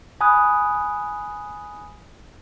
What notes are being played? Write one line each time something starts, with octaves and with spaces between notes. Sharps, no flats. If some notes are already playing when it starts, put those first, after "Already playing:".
G#5 B5 D#6 F#6